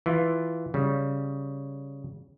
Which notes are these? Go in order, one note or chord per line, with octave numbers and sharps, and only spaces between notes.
E3 F4
C#3 G3